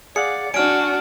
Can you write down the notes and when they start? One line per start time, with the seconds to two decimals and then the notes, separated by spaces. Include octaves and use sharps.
0.16 G#4 D5 F5 F#5 C#7
0.54 D4 F#4 G#5 F6 D7